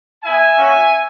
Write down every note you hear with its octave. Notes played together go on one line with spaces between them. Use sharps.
B3 E4 E5 G#5
A#3 C#4 F#4